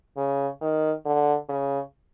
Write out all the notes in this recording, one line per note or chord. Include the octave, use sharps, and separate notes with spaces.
C#3
D#3
D3
C#3